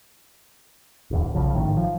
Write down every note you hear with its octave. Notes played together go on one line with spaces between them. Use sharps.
D1 E2
B1 C#3 F3
G#1 A2 D#3
F3